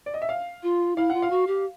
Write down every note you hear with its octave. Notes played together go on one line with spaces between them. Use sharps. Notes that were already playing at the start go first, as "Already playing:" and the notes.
D5
D#5
E5
F5
F4
E4 F5
F4 F#5
F5
F#4
G4